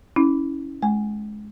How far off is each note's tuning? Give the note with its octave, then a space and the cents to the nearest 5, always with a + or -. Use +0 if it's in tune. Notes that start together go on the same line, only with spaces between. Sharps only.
C#4 +0 E4 -25
G#3 +25 G#5 +0